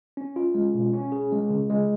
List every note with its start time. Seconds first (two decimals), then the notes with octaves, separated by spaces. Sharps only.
0.17 C#4
0.36 F4
0.55 G#3
0.74 B2
0.93 C#4
1.12 G#4
1.32 G#3
1.50 C#3
1.70 G#3